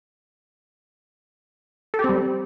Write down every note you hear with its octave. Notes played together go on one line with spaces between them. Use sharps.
A4
G4
C4
G3